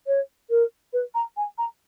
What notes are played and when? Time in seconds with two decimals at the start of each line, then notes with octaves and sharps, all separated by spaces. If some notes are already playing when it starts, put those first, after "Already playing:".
0.07 C#5
0.50 A#4
0.93 B4
1.15 A#5
1.37 G#5
1.58 A#5